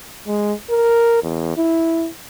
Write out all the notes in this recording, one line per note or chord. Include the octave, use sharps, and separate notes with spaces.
G#3
A#4
E2
E4